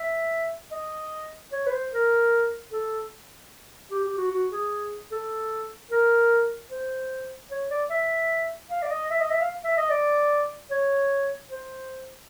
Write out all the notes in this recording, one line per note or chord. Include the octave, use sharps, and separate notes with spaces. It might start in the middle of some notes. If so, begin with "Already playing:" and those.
Already playing: E5
D#5
C#5
B4
C5
A#4
A4
G4
G4
F#4
F#4
G#4
A4
A#4
C5
C#5
D5
E5
F5
D5
D#5
E5
D#5
E5
F5
E5
D#5
D5
C#5
C5